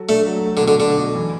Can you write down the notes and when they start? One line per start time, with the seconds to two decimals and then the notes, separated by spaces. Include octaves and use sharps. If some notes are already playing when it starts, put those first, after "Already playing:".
Already playing: F#3 F#4 A4
0.09 A3 D4
0.26 F#3
0.45 A3
0.57 D3
0.63 B2
0.68 D3
0.80 D3 D4
0.97 B2
1.15 E3